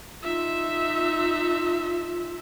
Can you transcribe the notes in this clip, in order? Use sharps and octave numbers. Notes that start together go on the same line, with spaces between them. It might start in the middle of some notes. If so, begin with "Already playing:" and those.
D#4 F4 E5